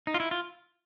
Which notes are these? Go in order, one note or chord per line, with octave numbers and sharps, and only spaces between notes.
D#4
F4
E4
F4